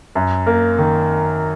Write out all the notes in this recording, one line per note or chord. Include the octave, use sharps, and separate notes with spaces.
F#2
A#3
D#3